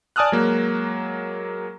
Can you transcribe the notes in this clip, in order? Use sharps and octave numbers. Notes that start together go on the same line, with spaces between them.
D5 G#5 A5 D#6 F6 F#6
F#3 G#3 A#3